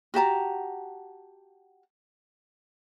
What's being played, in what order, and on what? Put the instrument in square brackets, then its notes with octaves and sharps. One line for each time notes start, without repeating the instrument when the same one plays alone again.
[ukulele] F#4 G4 A5 A#5